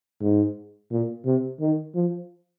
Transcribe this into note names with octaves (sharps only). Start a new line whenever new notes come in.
G#2
A#2
C3
D#3
F3